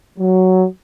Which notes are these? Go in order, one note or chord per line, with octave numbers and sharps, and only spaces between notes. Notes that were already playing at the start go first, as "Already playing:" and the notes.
F#3